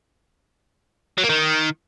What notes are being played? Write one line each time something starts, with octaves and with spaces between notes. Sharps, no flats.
F#3
A#3
D#3